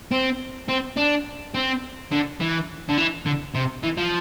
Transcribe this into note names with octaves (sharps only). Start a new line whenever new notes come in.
C4
C4
D4
C4
D3
E3
D3
E3
D3
C3
E3
F3